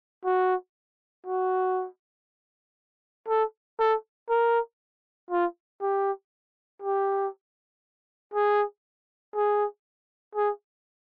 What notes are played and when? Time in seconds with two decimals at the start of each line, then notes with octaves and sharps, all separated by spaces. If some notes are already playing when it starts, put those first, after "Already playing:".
0.25 F#4
1.26 F#4
3.28 A4
3.79 A4
4.29 A#4
5.30 F4
5.82 G4
6.82 G4
8.34 G#4
9.35 G#4
10.35 G#4